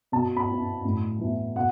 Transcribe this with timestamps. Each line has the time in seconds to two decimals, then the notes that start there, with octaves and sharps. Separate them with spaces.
0.12 B2 A5
0.37 B5
0.48 B3 E4
0.85 A2
1.20 E3 B3 E4
1.56 B2 F#5